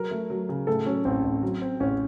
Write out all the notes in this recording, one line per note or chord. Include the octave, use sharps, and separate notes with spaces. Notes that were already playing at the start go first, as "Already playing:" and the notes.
Already playing: F#3 A#4
A3
F#3
C#3
A2 A4
F#3 C#4
A1 C4
A1
F#3
C4
A1 C#4